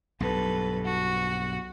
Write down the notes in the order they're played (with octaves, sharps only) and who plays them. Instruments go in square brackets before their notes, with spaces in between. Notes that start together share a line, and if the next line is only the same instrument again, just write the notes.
[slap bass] B1 G2 [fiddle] A4 B4
[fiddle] F#4